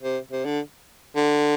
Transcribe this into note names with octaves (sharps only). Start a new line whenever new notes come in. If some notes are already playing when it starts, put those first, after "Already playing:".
C3
C3
D3
D3